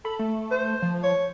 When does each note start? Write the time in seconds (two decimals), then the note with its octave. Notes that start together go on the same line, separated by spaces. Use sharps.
0.05 A4 B5
0.19 A3
0.51 C5
0.82 F3
1.03 C#5